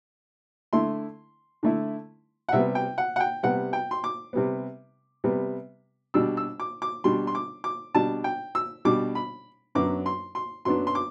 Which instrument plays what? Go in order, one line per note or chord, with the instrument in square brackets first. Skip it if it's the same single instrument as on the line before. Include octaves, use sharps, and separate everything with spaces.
[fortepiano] D3 A3 E4 C6
D3 A3 E4
F#5
C3 G3 B3 E5
G5
F#5
F#5
G5
C3 G3 B3 F#5
G5
C6
D6
C3 G3 B3
C3 G3 B3
B2 G3 D4 E6
E6
D6
D6
B2 G3 D4 C6
C6
D6
D6
B2 G3 D4 A5
G5
E6
B2 G3 D4 D6
B5
F#2 F#3 B3 D4 D6
C6
C6
F#2 F#3 B3 D4 C6
C6
D6